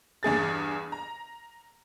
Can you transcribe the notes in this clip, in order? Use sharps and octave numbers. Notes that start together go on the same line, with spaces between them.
E2 G2 G#4 A6
A#5